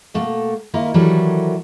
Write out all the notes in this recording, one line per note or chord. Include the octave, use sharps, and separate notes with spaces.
B2 A3 A#3
D#3 A#3 E4 F4 A#4
D#3 E3 F#3 G3 A4 A#4